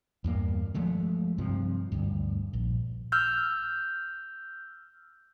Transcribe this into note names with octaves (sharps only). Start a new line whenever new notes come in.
E2 G2 A#3
F3 G#3 A3
G2 C3 F3
D2 G2
A#1
E6 F6 G6